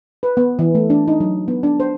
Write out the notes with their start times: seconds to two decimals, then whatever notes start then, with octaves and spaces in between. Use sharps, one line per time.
0.23 B4
0.37 B3
0.59 E3
0.75 A3
0.90 D4
1.08 D#4
1.20 F#3
1.48 B3
1.63 D4
1.80 C5